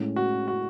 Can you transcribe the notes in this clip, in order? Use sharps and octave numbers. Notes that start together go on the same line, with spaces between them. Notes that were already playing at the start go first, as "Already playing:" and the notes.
Already playing: A2 G#3 C#4 E4
F#4
F#4